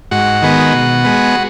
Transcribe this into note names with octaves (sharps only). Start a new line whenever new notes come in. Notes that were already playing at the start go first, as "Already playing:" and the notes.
G#2 F#4
D#3 G#3 B3
B2
G#3 B3